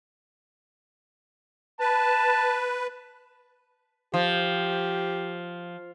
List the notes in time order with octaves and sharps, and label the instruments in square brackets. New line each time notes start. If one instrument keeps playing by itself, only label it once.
[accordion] B4 [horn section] A5
[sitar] F3 [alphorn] G4